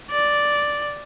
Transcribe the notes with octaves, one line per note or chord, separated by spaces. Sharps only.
D5